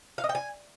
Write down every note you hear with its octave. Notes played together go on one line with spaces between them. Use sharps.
F5
D#5
G5
G#5